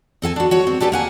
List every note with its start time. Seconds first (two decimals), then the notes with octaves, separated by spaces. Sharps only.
0.22 C4 A4 F#5 G#5
0.36 D4 F#4
0.51 F#4 C#5
0.67 C4
0.80 D4 G4 A4 B4 G#5
0.92 A#3 F#5 G#5